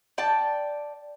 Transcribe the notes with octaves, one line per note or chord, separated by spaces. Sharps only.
D5 G5 A5